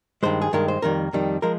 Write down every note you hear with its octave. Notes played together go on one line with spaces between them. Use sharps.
G2 D#3 G#3 C5
G#4
G2 D#3 G#3 A#4
C5
F2 D#3 G3 A#4
F2 D#3 G3
F3 G#3 A#4